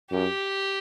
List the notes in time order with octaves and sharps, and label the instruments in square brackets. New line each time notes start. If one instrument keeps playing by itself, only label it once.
[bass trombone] F#2 [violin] G4